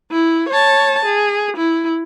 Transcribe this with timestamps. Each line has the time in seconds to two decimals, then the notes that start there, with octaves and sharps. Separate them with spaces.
0.11 E4
0.49 C#5 A5
1.05 G#4
1.57 E4